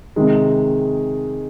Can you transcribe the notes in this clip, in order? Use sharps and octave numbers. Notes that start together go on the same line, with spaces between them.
C3 D#3 G#3